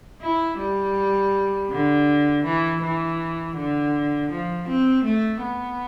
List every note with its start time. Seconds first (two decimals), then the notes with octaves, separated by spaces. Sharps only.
0.21 E4
0.58 G3
1.70 D3
2.44 E3
2.82 E3
3.57 D3
4.31 F3
4.68 C4
5.05 A3
5.43 B3